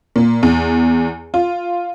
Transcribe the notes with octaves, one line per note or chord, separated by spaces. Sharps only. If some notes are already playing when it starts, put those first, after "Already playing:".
A#2
E2
F4